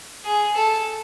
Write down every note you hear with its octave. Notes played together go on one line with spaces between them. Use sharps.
G#4
A4